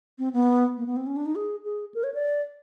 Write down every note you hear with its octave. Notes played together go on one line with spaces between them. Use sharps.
C4
B3
A#3
B3
C4
C#4
D4
D#4
G#4
G#4
A#4
C#5
D5